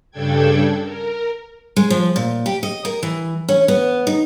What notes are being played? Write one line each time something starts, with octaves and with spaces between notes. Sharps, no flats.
G2 C#3 D4 A4 G5 G#6
A#4
G#3
F3
A#2
G4
D#5
A#4
E3
C#4
B3
D#4